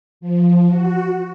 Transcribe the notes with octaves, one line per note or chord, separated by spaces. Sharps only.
F3
F#4